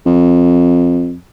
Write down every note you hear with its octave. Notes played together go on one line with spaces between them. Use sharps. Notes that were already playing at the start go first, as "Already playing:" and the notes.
F2